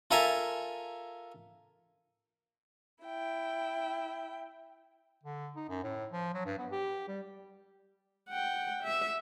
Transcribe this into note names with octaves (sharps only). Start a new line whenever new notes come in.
F4 A4 A#4 E5 G#5 A#5
E4 G5
D3
D#4
F#2
A2
F3
F#3
G2
B3
G4
G3
F#5 G5
E5